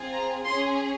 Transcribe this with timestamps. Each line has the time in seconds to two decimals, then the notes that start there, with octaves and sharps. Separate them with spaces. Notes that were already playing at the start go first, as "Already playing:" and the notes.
Already playing: C4 F4 G#4
0.12 A#5
0.44 C#4 G#4 C6